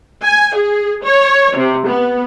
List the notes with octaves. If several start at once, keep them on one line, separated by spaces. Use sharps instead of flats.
G#5
G#4
C#5
C3
B3